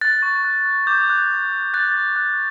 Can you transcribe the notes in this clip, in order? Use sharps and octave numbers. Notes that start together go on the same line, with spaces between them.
F#6 A6
C#6
F#6
F#6
D6 G6
F#6
F#6
F#6
F#6 A6
C#6
F#6